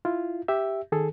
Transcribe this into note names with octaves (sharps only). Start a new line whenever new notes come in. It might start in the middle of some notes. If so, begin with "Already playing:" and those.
E4 F4
G4 E5
D#3 G#4 A4